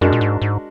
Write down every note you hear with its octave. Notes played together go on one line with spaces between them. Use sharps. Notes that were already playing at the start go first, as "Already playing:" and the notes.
F#2 G#3 D4 F#4 A#4
A#2
G#2
G#2